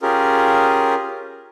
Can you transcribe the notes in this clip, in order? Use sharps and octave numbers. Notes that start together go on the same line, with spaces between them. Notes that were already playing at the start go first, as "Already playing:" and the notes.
C#4 F4 G4 G#4 A#4